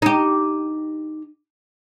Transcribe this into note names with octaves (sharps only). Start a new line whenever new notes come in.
D#4 G4